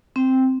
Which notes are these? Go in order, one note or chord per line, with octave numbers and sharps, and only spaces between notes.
C4